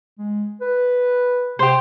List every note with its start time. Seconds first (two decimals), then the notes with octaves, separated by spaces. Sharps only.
0.19 G#3
0.61 B4
1.59 C3 G4 C5